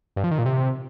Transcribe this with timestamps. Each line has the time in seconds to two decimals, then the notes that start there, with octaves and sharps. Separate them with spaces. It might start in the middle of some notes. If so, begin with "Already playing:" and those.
0.16 G2
0.24 F3
0.31 D#3
0.38 A#2
0.46 C3